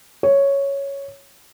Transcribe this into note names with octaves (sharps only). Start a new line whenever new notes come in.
C#5